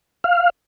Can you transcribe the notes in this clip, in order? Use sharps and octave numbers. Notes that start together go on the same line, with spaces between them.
F5